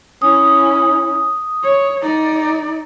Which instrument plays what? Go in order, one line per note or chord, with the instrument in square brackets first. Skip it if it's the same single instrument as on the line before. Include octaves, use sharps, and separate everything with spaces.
[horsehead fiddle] C#4 E4 [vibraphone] D#6
[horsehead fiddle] C#5
D#4 D5